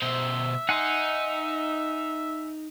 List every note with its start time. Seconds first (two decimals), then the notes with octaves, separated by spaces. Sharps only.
0.02 B2 C5 E5
0.69 D#4 F#5 G#5 C6